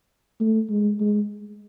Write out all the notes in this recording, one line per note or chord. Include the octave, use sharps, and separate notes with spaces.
A3
G#3
G#3